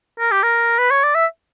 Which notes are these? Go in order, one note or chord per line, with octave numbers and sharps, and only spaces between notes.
A#4
G4
A#4
B4
C#5
D5
E5